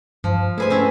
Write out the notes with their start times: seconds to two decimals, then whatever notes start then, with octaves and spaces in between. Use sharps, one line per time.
0.24 G2 F3
0.58 A3 E4 G#4 B4 C5 G#5
0.70 C4 C#4 E4